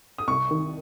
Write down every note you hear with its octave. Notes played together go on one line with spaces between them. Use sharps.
D#6
C2 C#6
D#3